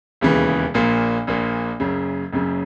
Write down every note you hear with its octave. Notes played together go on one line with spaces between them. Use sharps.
E1 D#2 C#3 E3
A#1 A#2 A#3
A#1 A#2 A#3
F#1 F#2 C#3
F#1 F#2 C#3